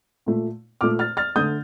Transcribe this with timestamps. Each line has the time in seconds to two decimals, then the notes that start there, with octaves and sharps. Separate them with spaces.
0.26 A#2 A3
0.81 A#2 A3 D6 F6
0.99 F6 A6
1.17 F6 A6
1.36 D3 A3 D#6 G6